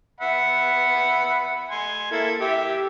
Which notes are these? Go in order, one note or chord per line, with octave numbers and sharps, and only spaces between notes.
E5 F#5 B5
G#5 C6
A#3 E4 A4
G4 E5